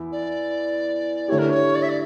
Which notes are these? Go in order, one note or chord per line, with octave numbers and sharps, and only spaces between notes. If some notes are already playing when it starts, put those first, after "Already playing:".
Already playing: E2 E4
D5
D3 A3 E4 G4 C#5
A#4
C#5
D5
E5
D5